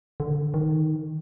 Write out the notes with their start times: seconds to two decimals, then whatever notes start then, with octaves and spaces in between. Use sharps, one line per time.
0.20 D3
0.54 D#3